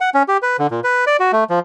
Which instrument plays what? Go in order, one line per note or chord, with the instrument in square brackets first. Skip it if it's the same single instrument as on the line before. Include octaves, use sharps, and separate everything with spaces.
[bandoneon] F#5
C#4
G4
B4
D3
A#2
B4
D5
F#4
A3
F3